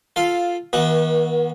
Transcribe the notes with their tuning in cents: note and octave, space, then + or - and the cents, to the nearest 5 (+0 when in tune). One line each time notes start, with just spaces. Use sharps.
F4 +0 A4 -5 F5 +5
D#3 +40 B3 -40 F#4 +0